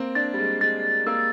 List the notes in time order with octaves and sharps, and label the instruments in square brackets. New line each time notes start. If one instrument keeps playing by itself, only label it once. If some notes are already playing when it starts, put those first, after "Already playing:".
Already playing: [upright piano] A#3 C4
[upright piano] D4 [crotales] A6
[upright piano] G3
G#3
[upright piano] G#3 [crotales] A6
[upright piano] A#3 [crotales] E6